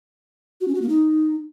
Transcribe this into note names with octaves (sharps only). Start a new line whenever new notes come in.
F#4
C#4
F#4
A#3
D#4